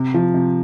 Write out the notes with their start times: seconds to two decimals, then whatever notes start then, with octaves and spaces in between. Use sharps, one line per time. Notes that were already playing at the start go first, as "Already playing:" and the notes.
Already playing: C3
0.14 F3
0.34 C3